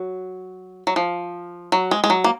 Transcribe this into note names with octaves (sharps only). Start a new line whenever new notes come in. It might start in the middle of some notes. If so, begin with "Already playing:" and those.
Already playing: F#3
F#3
F3
F#3
G#3
G#3
F#3
A#3